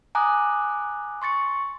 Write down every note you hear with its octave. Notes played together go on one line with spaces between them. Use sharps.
G#5 A#5 D6 D#6 F#6
C6 C#6 A6 C#7